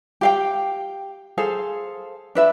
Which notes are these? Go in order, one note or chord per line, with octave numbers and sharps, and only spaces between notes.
G4 F5 G5
G#4 A4 C5 F5
D4 B4 E5